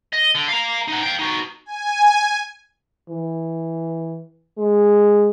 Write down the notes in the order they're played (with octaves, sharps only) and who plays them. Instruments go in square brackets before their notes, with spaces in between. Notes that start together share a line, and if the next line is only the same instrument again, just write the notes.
[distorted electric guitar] D#5
D3
F5 A#5
D#4 F#5
F5 G5
D#4 F#4
[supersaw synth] G#5
[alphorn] E3
G#3